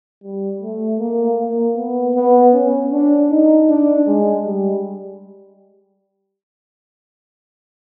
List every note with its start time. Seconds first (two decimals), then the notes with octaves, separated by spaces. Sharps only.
0.23 G3
0.62 A3
0.99 A#3
1.39 A#3
1.76 B3
2.15 B3
2.53 C#4
2.91 D4
3.30 D#4
3.69 D4
4.07 G#3
4.45 G3